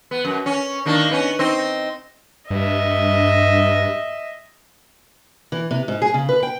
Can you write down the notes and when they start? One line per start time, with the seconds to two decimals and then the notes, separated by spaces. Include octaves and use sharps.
0.11 B3
0.25 F#2
0.46 C#4
0.86 D#3 A#3 D4
1.11 B3 C#4
1.39 C4 D#4
2.50 G2 D#5 E5
5.52 E3
5.71 C3
5.88 G#2
6.02 G#4
6.14 C#3
6.29 B4
6.43 G5